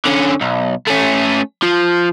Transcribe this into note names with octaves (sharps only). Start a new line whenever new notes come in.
D3 C#4
B1
A3 C#4
F3